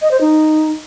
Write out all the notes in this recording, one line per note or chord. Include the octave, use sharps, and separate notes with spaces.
D#5
C5
D#4